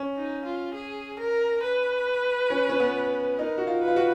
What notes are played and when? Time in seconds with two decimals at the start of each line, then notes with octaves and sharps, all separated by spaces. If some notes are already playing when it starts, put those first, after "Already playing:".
Already playing: C#4
0.16 D#4
0.45 F4
0.74 G#4
1.19 A#4
1.63 B4
2.50 C#4
2.69 C#4
2.80 B3
3.38 D#4 A#4
3.58 F#4
3.67 F4
3.82 B4
3.88 F4
3.96 F#4